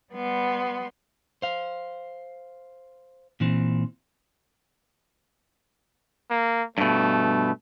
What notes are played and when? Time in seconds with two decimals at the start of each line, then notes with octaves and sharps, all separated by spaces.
0.13 G3 B3 C6
1.42 C5 F5
3.40 A#2 E3 C4
6.30 A#3
6.78 G2 B2 A3